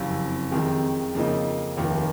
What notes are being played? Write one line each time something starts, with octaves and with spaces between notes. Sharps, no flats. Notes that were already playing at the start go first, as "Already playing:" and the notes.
Already playing: F#1 F2 C3
F2 C3 D#3 G#3
F2 C#3 F3 A#3 D#4
F1 D#2 D#3